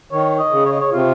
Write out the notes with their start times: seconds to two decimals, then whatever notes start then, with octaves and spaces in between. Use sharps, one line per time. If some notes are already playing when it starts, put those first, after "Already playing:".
0.12 D#3 C#5
0.38 D#5
0.51 C#3
0.65 C#5
0.72 D#5
0.80 C#5
0.92 C3 F4